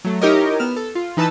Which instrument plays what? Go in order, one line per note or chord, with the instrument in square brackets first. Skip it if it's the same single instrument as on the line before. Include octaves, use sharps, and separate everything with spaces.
[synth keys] F#3 A3
D#4 E4 G4 A#4 C#5 D#5
B3 F6 E7
A4
F4
E3 D#4 B4 A5 E6